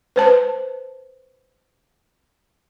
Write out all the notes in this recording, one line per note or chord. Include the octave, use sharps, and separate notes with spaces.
B4 C5 A5